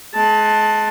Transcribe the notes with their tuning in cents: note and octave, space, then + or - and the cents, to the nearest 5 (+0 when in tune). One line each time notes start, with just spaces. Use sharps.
G#3 +35 A5 +0